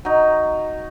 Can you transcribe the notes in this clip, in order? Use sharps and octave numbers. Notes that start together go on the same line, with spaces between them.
F#3 D#4